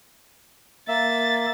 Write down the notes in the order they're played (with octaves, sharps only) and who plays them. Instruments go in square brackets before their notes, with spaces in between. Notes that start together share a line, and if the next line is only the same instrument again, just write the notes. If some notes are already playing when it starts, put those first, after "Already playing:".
[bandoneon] A#3 E5 [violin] A6